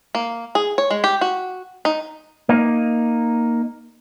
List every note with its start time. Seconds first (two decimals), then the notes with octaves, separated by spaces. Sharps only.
0.15 A#3
0.55 G#4
0.78 C#5
0.90 G#3
1.04 G4
1.21 F#4
1.85 D#4
2.49 A#3 D#4